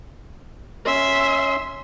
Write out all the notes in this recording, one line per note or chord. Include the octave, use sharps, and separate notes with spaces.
C#4 E5 C6